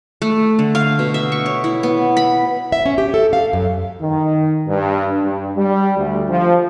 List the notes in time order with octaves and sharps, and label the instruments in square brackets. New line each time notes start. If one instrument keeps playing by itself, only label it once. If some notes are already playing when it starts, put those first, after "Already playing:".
[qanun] A3
D3
F5
B2
E5
C#6
C#5
E4
B3
B5
[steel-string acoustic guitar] E5
C#4
G4
A4
F5
F#2
[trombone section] D#3
G2
G2
G3
D2
F3